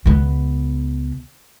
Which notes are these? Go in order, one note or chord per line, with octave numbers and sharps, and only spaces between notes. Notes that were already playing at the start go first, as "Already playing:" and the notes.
C#2 B3